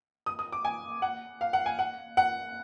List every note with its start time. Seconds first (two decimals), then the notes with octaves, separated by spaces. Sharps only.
0.26 D#6
0.39 D#6
0.52 D6
0.65 G#5
1.02 F#5
1.41 F5
1.53 F#5
1.66 G#5
1.79 F#5
2.17 F#5